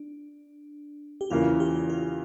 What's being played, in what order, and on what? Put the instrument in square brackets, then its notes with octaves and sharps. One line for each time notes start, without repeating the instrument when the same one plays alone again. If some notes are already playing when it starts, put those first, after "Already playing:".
Already playing: [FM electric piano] D4
G4
[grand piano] E2 C#3 E3 A#3 [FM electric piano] F4
[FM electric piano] G4
F4